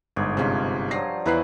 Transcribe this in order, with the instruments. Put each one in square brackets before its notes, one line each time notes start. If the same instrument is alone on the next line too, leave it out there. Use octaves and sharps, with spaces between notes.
[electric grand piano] G1 G#2 [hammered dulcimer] G#4
[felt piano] C3 G#3 D#4 [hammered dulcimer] F3 C#4
[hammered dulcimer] G2 F3 F#3 [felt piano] A#6 C7
[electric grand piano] E2 E4 B4 [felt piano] A#5 F#6 C7